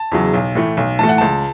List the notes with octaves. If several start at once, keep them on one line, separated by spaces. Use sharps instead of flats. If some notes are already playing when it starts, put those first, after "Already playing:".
Already playing: A5
E2 C#3 F#3
B1
A2 E3 A3
B1
A2 E3 A3 A5
F#5
C#2 A5